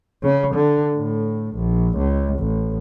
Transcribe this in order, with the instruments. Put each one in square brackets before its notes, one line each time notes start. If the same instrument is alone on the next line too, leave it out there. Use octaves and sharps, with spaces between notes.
[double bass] C#3
D3
A2
A#1
C#2
A1